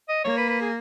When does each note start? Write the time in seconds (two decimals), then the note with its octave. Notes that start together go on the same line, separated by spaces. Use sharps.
0.09 D#5
0.24 A#3 C#5
0.37 B4
0.49 B4
0.61 G#4